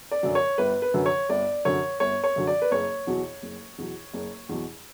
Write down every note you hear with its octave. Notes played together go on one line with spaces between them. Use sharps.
D5
F#2 D3 F#3
C#5
G1 B4
B4
F#2 D3 F#3
C#5
G1 D5
F#2 D3 F#3 C#5
G1 C#5
C#5
F#2 D3 F#3
D5
B4
F#1 C#5
E2 B2 F#3
F#1
E2 B2 F#3
F#1
E2 B2 F#3